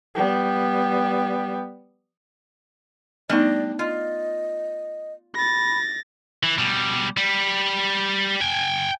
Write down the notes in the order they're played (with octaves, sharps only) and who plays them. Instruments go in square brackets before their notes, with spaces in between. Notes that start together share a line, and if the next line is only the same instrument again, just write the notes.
[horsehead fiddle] G3 B3
[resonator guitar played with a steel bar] G3 D4 D#5 [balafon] A3 B3 D#4 [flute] D5
[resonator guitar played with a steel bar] F4 [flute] D#5
[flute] B5 [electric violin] A6 A#6
[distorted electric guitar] E3
B2 G3
G3
G5 G#5